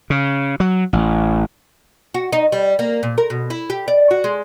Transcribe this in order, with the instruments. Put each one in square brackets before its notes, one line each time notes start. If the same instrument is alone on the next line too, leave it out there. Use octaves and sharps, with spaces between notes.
[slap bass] C#3
F#3
A1
[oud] F#4
D#4
G3
A#3
A#2
A#4
B2
E4
G4
D5
F#4
G#3